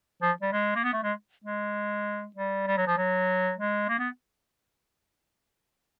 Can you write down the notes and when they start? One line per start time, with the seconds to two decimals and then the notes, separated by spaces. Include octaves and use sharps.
0.22 F3
0.42 G3
0.52 G#3
0.75 A#3
0.84 B3
0.93 A3
1.03 G#3
1.44 G#3
2.36 G3
2.67 G3
2.77 F#3
2.87 F3
2.97 F#3
3.58 G#3
3.89 A#3
3.99 B3